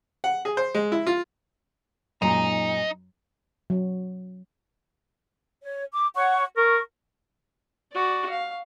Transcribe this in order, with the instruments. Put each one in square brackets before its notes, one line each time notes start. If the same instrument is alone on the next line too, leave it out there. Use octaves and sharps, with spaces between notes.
[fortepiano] F#5
G#4
C5
G#3
E4
F4
[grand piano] F#2 [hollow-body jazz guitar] A#2 G#3 A#5 [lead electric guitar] D#4
[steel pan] F#3
[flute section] C#5
D6
C#5 F#5 C#6
[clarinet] A#4 [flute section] C#6
[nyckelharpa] F#4 D5
F5